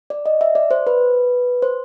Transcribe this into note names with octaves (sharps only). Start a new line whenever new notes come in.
D5
D#5
E5
D5
C5
B4
C5